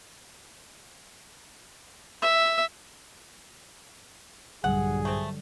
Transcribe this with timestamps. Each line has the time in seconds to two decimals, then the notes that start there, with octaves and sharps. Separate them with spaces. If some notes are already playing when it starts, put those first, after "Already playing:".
2.22 E5
4.64 A#1 G2 D3 F#3 G3 G#4 F#5
5.05 A3 C4